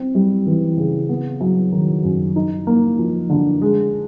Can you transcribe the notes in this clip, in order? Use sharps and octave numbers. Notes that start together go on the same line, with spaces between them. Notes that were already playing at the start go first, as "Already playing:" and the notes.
Already playing: C4
G3
E3
C#3
B3
F#3
D#3
F#2
D#4
A#3
F3
D3
G#3